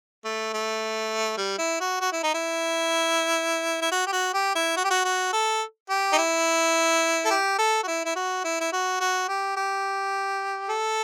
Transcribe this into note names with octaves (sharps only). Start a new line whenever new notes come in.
A3
A3
G3
E4
F#4
F#4
E4
D#4
E4
E4
F#4
G4
F#4
G4
E4
F#4
G4
F#4
F#4
A4
G4
D#4
E4
A4
G4
A4
F#4
E4
E4
F#4
E4
E4
F#4
F#4
G4
G4
A4